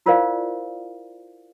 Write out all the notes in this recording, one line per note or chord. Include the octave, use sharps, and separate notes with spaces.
E4 F4 A#4 C5 D5 F5